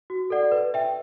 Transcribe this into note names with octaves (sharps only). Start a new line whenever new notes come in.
F#4
A4 D5 F#5
B4
E5 G5